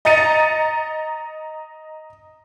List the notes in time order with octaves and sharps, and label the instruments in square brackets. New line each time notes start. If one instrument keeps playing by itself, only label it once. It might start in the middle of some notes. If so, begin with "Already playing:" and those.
[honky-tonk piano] D#5 A#5 A6 C#7 D#7